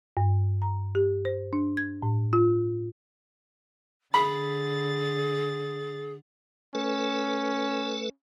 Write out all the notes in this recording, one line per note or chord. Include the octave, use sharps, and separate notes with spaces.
G2
A#5
G4
C5
D4
G#6
A2
F4
D3 G#4 B5 A6
A3 C#4 A4 B4